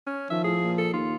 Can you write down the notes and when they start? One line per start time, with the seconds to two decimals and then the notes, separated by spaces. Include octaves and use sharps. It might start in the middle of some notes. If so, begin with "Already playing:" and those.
0.07 C#4
0.30 D#3 F3 E5
0.44 A2 G#4
0.63 A#2
0.78 A4
0.94 D#2 F4